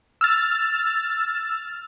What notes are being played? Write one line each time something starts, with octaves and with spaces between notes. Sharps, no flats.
E6 F6 A6